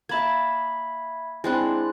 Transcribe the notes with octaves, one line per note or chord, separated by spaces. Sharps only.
A#3 E5 A5 B5 G#6
G#3 C4 D4 E4 F#6